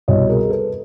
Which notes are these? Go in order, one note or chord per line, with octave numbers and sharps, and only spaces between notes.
C2 B2 G3 C#5 D#5
G#4 A#4
A4 B4